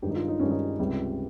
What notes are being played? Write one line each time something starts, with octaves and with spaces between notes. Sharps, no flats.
G2 D#3 G#3 G4
D#4
F4
D#4
G2 D#3 G#3 C#4
D#4
C#2 C3 G3